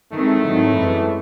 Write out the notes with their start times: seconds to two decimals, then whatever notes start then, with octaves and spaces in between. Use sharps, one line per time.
0.12 A2 D#3 G#3 A3 C4
0.44 G#2 D#3 F#3 C4
0.74 F#2 E3 G#3